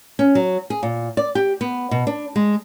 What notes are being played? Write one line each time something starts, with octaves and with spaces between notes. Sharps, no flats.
C#4
F#3
G#4
A#2
D5
G4
B3
B2
D4
G#3